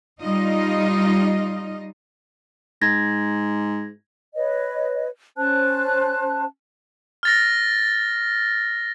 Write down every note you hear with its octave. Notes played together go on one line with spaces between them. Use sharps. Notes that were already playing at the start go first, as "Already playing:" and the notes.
G3 D#4 F4 D#5
G#2 G#6 A#6
B4 C#5 D#5
C#4 C5 A5 F#6
F6 A6 A#6